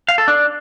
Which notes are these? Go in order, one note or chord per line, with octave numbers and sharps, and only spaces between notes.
F5
A4
D4